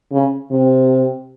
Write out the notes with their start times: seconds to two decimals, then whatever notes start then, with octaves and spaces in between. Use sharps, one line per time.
0.12 C#3
0.51 C3